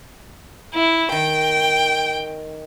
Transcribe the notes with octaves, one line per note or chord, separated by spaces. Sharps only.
E4
D#3 G5